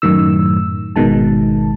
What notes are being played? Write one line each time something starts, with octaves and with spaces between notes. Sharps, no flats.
F#2 A2 D#3 E6
G#1 B2 D#3 G#3 A5